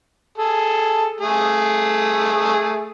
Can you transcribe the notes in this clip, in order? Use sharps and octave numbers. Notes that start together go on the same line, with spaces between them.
G#4 A4
A3 G#4